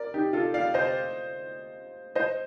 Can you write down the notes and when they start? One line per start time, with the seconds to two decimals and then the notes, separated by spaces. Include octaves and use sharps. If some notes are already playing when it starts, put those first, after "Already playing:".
Already playing: A#4 D5
0.14 D#4 G4
0.33 F4 A4
0.54 D5 F5
0.74 C5 D#5
2.15 C5 D#5